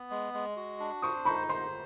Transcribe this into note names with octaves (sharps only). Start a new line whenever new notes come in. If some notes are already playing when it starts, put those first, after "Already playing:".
Already playing: B3
G#3
G#3
F#4
D4
C5 C#6 D#6
D#4 B5 C#6
C5 A#5 C6